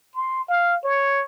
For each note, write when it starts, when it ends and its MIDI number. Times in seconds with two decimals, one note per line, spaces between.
0.15 0.47 84
0.48 0.77 77
0.84 1.23 73